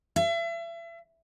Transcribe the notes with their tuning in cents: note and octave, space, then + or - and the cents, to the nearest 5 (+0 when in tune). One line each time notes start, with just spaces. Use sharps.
E5 +35